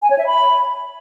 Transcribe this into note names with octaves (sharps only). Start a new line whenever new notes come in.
G#5
C#5
E5
B5